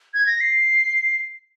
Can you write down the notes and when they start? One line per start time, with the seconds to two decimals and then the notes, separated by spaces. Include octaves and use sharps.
0.14 G#6
0.26 A#6
0.41 C7